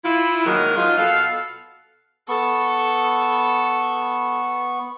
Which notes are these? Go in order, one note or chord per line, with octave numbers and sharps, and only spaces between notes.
E4 F4
D#3 F#3 G#3 A#3 G#4 A#4
F3 F#3 D#4 F4
B2 F#4 A4 F5
B3 A4 C#6